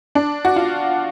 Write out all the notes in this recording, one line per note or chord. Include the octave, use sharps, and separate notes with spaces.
D4
F#4
F4